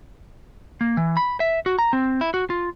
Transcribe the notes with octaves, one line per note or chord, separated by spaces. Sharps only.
A#3
E3
B5
E5
F#4
A#5
C4
E4
F#4
F4